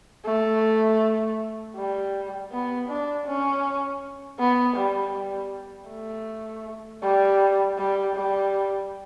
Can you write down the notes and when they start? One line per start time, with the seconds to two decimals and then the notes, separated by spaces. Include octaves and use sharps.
0.25 A3
1.76 G3
2.51 B3
2.89 D4
3.26 C#4
4.40 B3
4.76 G3
5.15 G3
5.89 A3
7.03 G3
7.78 G3
8.15 G3